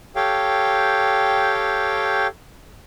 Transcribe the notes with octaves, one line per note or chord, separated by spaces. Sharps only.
G4 A4 C#5 F5 G5